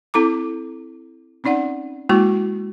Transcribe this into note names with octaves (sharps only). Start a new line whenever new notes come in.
C4 E4 A4 A#5 D6
C4 C#4 D#4 D5 F#5
G#3 A#3 E4 F#4 C#6